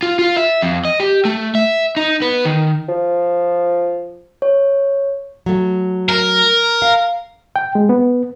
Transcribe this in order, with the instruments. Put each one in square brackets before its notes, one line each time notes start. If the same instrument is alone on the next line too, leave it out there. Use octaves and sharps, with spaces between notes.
[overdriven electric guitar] F4
F4
E5
F2
D#5
G4
A3
E5
D#4
B3
D#3
[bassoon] F3
[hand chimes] C#5
[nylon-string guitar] F#3 A3
[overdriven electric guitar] A#4
[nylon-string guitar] F5
[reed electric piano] G5
G#3
B3